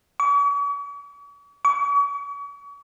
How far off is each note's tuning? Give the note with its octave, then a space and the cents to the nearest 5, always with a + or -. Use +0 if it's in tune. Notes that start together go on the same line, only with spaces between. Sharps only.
C#6 +45
C#6 +40